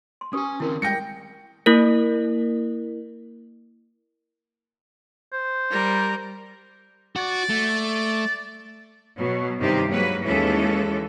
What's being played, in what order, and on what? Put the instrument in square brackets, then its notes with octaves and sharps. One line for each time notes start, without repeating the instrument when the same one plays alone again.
[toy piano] C6
[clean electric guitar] C#4 G#5 [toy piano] G4 B4 D#6
[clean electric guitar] D#3 C4 C#4 [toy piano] E4 A#4
[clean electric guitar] G3 G#3 [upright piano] G5 A#6 C#7
[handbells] A#3 E4 A#4
[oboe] C5
[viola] G3 A#4
[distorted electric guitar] F#4 [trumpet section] D5
[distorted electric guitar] A3
[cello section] B2 F#3
G2 C3 D#3 C4 D#4 G4
F#3 G#3 A#3 B4
D#2 E3 G#3 C#4 A4